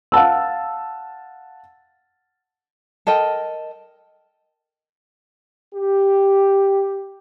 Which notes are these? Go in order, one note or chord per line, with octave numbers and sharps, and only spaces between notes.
F5 F#5 A5 E6
A4 A#4 D#5 G5
G4